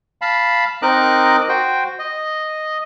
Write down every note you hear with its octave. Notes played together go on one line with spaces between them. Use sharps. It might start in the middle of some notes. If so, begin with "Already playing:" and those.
F5 A5 B5
C4 D#4 A#4 D#5 D6 F#6
F#4 C5 G5
D#5